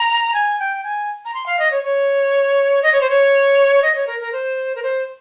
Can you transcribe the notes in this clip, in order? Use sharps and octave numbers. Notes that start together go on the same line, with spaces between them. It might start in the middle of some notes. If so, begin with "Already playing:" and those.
Already playing: A#5
G#5
G5
G#5
A#5
C6
F5
D#5
C#5
C#5
D#5
C#5
C5
C#5
D#5
C#5
A#4
A#4
C5
A#4
C5